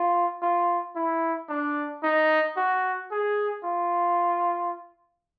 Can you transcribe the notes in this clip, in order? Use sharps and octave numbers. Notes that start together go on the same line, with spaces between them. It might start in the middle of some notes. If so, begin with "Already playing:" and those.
Already playing: F4
F4
E4
D4
D#4
F#4
G#4
F4